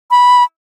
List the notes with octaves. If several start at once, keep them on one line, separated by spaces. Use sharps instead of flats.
B5